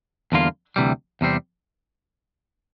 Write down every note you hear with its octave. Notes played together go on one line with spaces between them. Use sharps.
E2 D3 G3 A#3 F4
D2 C3 E3 G3
E2 C3 G3 C4